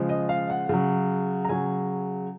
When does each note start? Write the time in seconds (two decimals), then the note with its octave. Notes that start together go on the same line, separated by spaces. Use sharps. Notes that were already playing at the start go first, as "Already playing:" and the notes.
Already playing: C#3 F3 G#3
0.09 D#5
0.29 F5
0.50 F#5
0.69 C#3 F#3
1.45 A#5
1.49 C#3 F#3 G#5